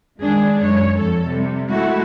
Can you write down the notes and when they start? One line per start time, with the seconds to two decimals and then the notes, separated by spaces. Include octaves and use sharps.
0.21 D#3 G#3 D4 G#4
0.62 F#2 G#3 C#5
0.99 F2 F3 A4
1.28 C3 G3
1.71 G#3 A3 E4 F#4